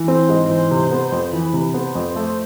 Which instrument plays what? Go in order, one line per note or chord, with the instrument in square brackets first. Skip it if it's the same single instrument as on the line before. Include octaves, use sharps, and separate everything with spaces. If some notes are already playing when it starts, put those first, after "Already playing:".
Already playing: [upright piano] E3
[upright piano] C4 [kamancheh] C5
[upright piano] G#2
[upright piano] E3 [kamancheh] C5
[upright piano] C3
B3
F2
[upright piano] E3 [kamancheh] B4
[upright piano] C3
[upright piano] B3 [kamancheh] C5
[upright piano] F2
A3